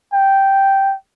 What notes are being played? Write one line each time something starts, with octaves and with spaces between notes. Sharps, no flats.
G5